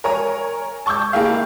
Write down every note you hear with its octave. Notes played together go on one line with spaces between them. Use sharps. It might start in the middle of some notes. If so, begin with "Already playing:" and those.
A#4 C#5 G#5 A#5
A5 C#6 D6 E6 G6
G#3 A#3 E4 G4 G#4 F5